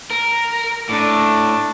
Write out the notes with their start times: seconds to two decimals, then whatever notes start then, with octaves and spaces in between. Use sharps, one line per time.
0.10 A#4
0.89 A2 D4 A5